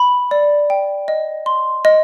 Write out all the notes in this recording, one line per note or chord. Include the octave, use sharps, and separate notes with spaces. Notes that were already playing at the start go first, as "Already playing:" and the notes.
Already playing: B5
D5
G5
D#5
C6
D#5